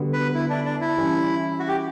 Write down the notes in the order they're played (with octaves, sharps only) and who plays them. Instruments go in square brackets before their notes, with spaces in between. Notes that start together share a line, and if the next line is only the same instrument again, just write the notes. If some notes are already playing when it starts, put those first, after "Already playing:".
Already playing: [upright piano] D3 G3 B3 F#4
[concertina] B4
E4
D4
D4
E4
[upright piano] E3 G3 C#4
[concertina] F#4
G4